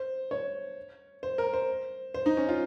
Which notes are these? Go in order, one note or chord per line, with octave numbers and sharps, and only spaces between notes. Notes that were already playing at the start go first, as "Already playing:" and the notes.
Already playing: C5
C#5
C5
A#4
C5
C5
D#4
C#4
F4